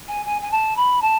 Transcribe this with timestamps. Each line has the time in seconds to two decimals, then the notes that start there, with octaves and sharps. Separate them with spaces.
0.08 G#5
0.26 G#5
0.42 G#5
0.51 A5
0.77 B5
1.02 A5